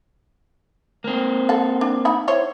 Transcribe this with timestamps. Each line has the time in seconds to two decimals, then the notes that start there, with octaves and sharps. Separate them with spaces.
1.04 A#3 C4
1.49 A4 F#5
1.81 D4
2.05 D#4 F#5 B5
2.28 E4 C5 C#5